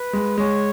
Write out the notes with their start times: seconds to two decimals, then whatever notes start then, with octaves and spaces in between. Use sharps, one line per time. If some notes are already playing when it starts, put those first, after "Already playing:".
Already playing: B4
0.13 G#3
0.38 G#3 C#5